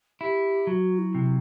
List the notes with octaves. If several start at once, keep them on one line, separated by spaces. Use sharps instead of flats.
E4 G4
F#3 F#4
E4
C3